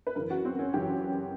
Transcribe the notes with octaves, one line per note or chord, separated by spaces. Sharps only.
B4
F#2 C#3 E3 A#4
F#4
C4
C#4
F#2 C#3 E3 G4